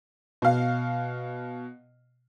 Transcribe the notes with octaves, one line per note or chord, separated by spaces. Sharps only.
B2 F5